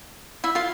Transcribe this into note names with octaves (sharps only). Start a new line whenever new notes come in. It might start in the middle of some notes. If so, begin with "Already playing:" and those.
E4 E5
F4 F5